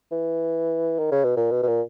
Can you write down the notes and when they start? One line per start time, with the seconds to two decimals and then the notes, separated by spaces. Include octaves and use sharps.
0.12 E3
0.99 D#3
1.12 C#3
1.24 B2
1.37 A#2
1.51 B2
1.63 B2
1.68 A#2